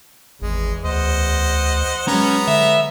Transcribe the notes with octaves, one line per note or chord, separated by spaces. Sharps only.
G#1 E2 G#3
D2 C5 D#5 F#5
F#3 G#3 B3 C#4 A#5
D3 E5